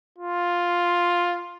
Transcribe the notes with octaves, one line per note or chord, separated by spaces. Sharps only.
F4